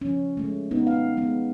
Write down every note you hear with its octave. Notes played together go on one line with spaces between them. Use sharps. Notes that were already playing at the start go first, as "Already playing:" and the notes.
F3 C#4
G#3 A3
B3 D#4
F5
G#3 B3